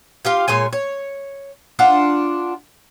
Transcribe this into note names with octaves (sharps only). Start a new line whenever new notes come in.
F4 G4 F5
A#2 G#3 C#5 G#5
C#5
D4 F4 F#5